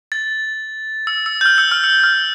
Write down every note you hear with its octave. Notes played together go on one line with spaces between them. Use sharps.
A6
E6
E6
G6
F6
E6
F6
E6
F6